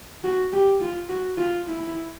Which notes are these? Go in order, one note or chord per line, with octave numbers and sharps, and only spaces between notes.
F#4
G4
F4
F#4
F4
E4